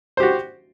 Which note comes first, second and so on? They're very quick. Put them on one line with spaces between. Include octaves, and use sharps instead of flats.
C5 G4 F#4